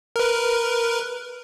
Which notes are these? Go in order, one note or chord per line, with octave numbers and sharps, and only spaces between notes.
A#4 B4